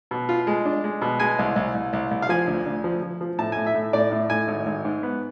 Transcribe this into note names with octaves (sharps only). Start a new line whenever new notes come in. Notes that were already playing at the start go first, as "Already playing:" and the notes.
B2
F4
G#3
D4
G#3
B2
G#3 G#5
C2
C2
C2
C2
C2
F5
F3 G#5
D2
D2
F3
F3
F3
A2 A5
A2 G#5
E5
A2
A2 D5
A2
A2 G#5
G#1
G#1
G#2
B3